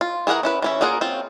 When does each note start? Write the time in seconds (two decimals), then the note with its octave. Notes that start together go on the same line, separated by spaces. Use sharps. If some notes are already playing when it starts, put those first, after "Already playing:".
0.01 F4
0.27 E3 G#4 A#4 F#5 A#5
0.43 C#4 E4 B4
0.62 E3 C#4 E4
0.81 A#3 F4 G#4 A#4 F#5
1.01 C4 C#4 F4